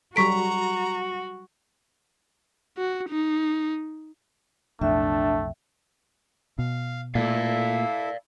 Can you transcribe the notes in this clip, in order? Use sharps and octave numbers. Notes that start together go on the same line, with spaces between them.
F#3 G3 F#4 A4 A#5 C#6 B6 D7
F#4
D#4
B1 F2 A2 A3 D4 E5 G5
B2 F5
A#2 A3 E4 A4 D5 F5